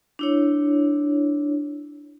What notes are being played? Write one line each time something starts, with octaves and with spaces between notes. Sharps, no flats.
D4 E4 C#5